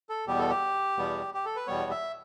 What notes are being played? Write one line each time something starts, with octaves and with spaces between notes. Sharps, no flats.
A4
E2 B2 G3 B3 G4
A4
G4
E2 B2 G3 B3
G4
A4
B4
E2 B2 G3 B3 C#5
E5